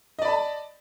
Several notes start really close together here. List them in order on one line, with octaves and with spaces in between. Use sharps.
D#5 D5 B5 A5